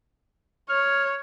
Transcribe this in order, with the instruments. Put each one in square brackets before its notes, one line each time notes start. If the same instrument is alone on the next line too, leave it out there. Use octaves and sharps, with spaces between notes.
[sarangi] C#5 [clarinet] F6